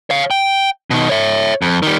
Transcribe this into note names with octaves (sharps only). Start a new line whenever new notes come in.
C#5 F5
G5
B2 D#3
C#5 E5
F2
D#3 G3